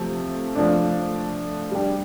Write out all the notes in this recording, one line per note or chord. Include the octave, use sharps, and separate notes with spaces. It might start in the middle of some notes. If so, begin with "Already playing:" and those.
Already playing: C3 F3 A3
F3 A3 D4
G3 D4 G4